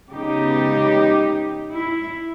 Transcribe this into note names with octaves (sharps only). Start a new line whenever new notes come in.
C#3 G#3 B3 D#4 G4
E4